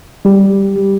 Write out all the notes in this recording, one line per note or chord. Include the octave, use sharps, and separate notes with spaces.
G3 G4